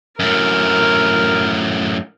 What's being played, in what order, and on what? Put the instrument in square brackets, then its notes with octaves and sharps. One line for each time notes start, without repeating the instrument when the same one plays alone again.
[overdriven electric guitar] F#2 A2 [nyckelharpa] A#4